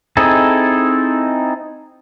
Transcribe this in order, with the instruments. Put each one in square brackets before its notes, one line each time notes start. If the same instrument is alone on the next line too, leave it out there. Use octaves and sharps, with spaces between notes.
[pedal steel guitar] C4 D#4 E4 G#4 A4